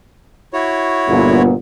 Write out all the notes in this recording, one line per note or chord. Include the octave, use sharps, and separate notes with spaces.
E4 F#4 C#5
G1 A#2 B3